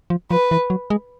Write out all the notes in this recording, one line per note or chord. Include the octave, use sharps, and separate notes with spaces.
F3
F3 B4
E3
F#3
G#3